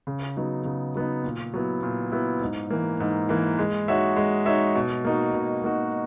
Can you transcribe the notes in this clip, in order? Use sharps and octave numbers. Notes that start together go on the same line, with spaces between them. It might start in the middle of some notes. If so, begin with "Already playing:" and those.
C#3
F#3 B3 D#4
C#3
F#3 B3 D#4
A#2
F#3 B3 E4
A#2
F#3 B3 E4
G#2
E3 A#3
G#2
E3 A#3
G#3
D#4 F#4 C#5 E5
G#3
D#4 F#4 C#5 E5
B2
A#3 D#4 F#4
B2
A#3 D#4 F#4